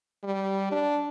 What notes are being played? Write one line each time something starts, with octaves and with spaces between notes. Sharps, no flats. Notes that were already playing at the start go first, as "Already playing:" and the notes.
G3
D4